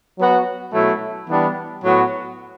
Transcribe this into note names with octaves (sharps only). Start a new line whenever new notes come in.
F#3 B3 F#4
B2 F#3 A3 E4
E3 G3 B3 D4
A2 F#3 B3 F#4